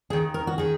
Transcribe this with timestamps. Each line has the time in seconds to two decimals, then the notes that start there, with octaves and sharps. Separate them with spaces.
0.10 D#2 D#3 G#4
0.34 A#4
0.47 F#4
0.58 D#3 G#4